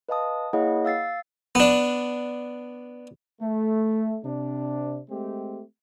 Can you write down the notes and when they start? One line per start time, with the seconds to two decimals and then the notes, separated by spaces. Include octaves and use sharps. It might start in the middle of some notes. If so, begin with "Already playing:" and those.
0.09 B4 D#5 F5 A5 D#6
0.53 A#3 E4 G#4 C#5 D#5 F#5
0.84 F5 E6 A6 C7
1.55 B3 D4
3.41 A3
4.25 C3 D4
5.09 G#3 A3 C4 G4